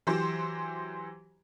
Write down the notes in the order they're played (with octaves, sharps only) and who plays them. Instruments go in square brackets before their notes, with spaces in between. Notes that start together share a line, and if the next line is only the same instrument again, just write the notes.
[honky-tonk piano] E3 F#3 G4 C5